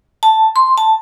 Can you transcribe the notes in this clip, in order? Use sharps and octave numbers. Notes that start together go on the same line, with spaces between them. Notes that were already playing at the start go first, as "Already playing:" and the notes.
A5
C6
A5